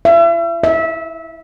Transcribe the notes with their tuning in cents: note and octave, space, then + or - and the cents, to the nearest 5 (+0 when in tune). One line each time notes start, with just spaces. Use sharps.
E5 +40
E5 -20